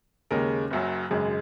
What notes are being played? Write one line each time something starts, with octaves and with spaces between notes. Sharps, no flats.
D#2 C#3 G#3 C#4 A#4
F#1 F#2 F#3
G#1 F#2 C#3 G#3